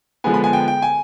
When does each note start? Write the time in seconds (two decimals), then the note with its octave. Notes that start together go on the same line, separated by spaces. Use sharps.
0.24 D3 F3 G#3 B3 G#5
0.34 B5
0.44 G#5
0.53 G5
0.68 G5
0.82 G#5